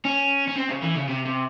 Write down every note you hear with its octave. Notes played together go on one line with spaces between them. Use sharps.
C#4
C#4
C4
C#3
E3
C#3
C3
C3